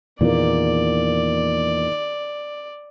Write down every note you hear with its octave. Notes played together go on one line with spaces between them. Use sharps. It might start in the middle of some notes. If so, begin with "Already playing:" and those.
E2 A#2 D#3 A#3 D5